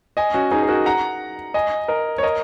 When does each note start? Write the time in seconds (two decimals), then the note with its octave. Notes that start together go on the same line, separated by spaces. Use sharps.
0.17 D#5 G#5
0.34 C#4 F#4
0.51 D#4 G#4
0.63 G#4
0.68 F#4 A#4
0.86 F#5 A#5
1.54 D#5 G#5
1.88 A#4 D#5
2.18 C#5
2.23 A#4 D#5